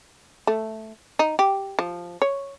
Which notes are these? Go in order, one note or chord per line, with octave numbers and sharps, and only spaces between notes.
A3
D#4
G4
F3
C#5